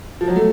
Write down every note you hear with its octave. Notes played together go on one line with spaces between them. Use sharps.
F3
F#3
A3